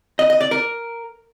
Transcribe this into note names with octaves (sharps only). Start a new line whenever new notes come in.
D#5
D#5
D5
A#4